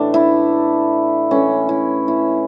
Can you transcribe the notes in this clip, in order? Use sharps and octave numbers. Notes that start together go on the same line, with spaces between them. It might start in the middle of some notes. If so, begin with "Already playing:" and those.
Already playing: A2 E3 A3 D4
E4
A2 E3 A3 C#4
E4
E4